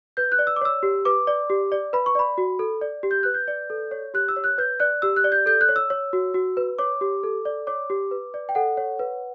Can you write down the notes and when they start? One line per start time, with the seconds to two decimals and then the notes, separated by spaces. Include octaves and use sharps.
0.17 B4 G6
0.32 F#6
0.39 D5
0.47 E6
0.56 D6
0.61 C#5 E6
0.83 G4
1.05 B4 D6
1.27 D5
1.50 G4
1.72 D5
1.93 B4 B5
2.06 C#6
2.15 D5 B5
2.38 F#4
2.59 A4
2.82 D5
3.03 G4
3.11 G6
3.23 B4 F#6
3.34 G6
3.48 D5
3.70 A4
3.91 C#5
4.14 G4 F#6
4.28 E6
4.36 C#5
4.44 F#6
4.58 B4 G6
4.80 D5 F#6
5.02 G4 E6
5.16 F#6
5.24 D5
5.32 G6
5.46 A4 G6
5.61 F#6
5.69 C#5
5.76 E6
5.90 C#5
6.13 F#4
6.34 F#4
6.57 B4
6.78 C#5 D6
7.01 G4
7.23 A4
7.45 D5
7.67 C#5 D6
7.90 G4
8.11 B4
8.34 D5
8.49 G5
8.55 A4 F#5
8.77 C#5
8.99 B4